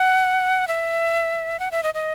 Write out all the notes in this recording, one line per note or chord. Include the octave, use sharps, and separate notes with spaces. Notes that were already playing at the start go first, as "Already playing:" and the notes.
Already playing: F#5
E5
F#5
E5
D#5
D#5